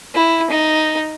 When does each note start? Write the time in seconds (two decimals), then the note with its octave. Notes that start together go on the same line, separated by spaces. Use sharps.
0.15 E4
0.50 D#4